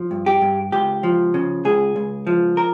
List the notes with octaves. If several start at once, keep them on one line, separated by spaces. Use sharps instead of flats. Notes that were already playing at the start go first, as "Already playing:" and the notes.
Already playing: F3
G2
G4
G2
C#2 G4
F3
C#3
C#2 G#4
C#2
F3
A#4